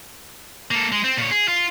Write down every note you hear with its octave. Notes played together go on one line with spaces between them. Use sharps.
A#3 A4
G#3
C4
A#2 C#5
G#4
F4